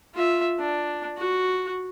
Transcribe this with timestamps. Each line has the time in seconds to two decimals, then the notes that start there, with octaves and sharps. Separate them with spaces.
0.15 F4 E5
0.59 D4
1.17 F#4